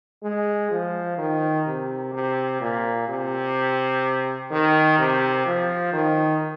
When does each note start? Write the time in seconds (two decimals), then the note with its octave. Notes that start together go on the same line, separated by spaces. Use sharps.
0.23 G#3
0.71 F3
1.18 D#3
1.66 C3
2.13 C3
2.60 A#2
3.08 C3
4.51 D#3
4.98 C3
5.46 F3
5.93 D#3